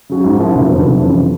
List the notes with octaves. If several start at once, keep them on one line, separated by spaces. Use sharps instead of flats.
C#3 F#3
G#2
F3 A#3 C#4 E4
F1
F2 D3 F#3 B3
F1
F2 C#3 E3